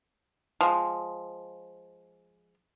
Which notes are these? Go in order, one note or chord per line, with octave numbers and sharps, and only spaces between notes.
F3 G#3